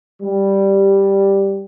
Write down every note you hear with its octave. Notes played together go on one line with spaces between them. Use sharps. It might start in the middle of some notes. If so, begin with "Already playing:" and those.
G3